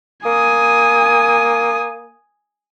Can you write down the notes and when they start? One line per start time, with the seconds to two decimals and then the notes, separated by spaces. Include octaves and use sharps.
0.25 A#3 G#5 D#6